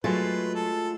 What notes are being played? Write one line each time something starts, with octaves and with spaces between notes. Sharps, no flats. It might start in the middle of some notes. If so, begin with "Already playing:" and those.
F#3 G#3 A3 F4 B4 C5
A4